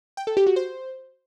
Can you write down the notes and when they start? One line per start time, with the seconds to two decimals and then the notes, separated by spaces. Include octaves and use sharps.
0.17 G5
0.27 A4
0.37 G4
0.47 F#4
0.56 C5